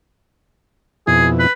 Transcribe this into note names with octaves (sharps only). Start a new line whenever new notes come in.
F2 B2 E4 G#4
B4